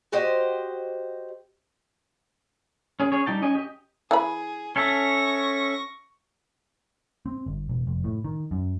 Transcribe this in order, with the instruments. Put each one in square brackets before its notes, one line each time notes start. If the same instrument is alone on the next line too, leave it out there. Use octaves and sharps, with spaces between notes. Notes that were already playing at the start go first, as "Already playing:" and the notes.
[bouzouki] F#4 G4 C5 D#5
[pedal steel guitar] C#4 G#4
C#4 G#4 C#5
G3 D#4 G5 A5
C#4 D#5 G#5
G4 D#5
[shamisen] E3 B5 [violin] G#4
[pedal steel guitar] C#4 A4 E5 [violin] C#6 A#6
[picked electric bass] C4
G1
E1
F1
A2
D#3
F#2